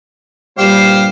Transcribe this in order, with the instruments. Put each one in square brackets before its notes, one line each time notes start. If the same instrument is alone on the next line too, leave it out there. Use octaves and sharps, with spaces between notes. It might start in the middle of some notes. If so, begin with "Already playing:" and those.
[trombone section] G2 A#2 G3 [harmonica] G4 C5 F5